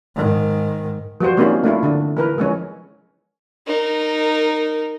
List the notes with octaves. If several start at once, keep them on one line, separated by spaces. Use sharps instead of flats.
G#2 D#3
F3 G3 F#4 C5
G3 A#3 C4 C#4 D#4 F4
A3 D4 E4 F4
D3 D4
E3 A#4 B4
F3 G#3 C#4
D#4 A#4